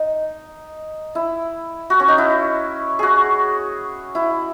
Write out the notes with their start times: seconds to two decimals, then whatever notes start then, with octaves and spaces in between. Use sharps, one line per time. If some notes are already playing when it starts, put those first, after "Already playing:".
Already playing: D#4
1.15 E4
1.90 F#4
2.00 C#4
2.08 D#4
2.18 E4
2.99 F#4 G#4
4.15 E4